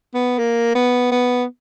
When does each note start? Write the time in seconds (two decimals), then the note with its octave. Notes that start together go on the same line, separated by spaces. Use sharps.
0.14 B3
0.39 A#3
0.75 B3
1.11 B3